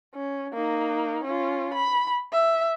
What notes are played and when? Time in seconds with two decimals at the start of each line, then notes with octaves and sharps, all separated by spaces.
0.15 C#4
0.53 A#3 D#4
1.24 C#4 F4
1.74 B5
2.33 E5